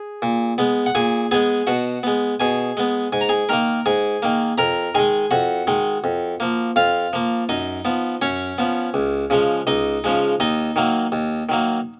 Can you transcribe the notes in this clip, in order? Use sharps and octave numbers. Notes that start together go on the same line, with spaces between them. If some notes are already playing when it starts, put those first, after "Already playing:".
Already playing: G#4
A#2
G#3 B3
F#5
A#2 G#4 G#5
G#3 B3 G#4 G#5
B2 F#4 F#5
G#3 B3
B2 G#4 G#5
G#3 B3
G#2 G#5
A#5
G#4 G#5
D#3 A#3 A#4 A#5
G#2 G#4 G#5
D#3 A#3
F2 A#4 A#5
D#3 G#3 G#4 G#5
F2 F#4 F#5
D#3 G#3
F2
F3 A#3
F2 F4 F5
F3 A#3
F#2 D#4 D#5
F3 B3
F#2 C#4 C#5
F3 B3
C#2
C#3 F3 G#3
C#2 D#4 D#5
C#3 F3 G#3
D#2 D#4 D#5
D#3 F#3 A#3
D#2
D#3 F#3 A#3